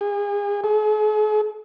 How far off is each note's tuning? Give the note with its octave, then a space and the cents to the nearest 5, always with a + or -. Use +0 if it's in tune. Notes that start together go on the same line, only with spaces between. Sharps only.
G#4 -35
G#4 +45